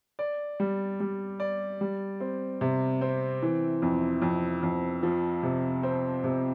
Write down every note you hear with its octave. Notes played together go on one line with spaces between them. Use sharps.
D5
G3
G3
D5
G3
C4
C3
C4
E3
F2
F2
F2
F3
C3
C4
C3